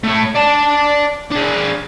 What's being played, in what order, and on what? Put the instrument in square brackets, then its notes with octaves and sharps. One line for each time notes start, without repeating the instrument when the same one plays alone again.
[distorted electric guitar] A3 C#5
D5 A5
D4 G#4